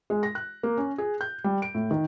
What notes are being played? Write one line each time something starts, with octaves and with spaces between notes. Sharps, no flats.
G#3
A#6
F#6
A#3
C#4
G#4
G6
G3
D7
A2
D#3